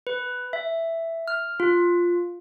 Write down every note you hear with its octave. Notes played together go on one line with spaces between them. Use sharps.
B4
E5
F6
F4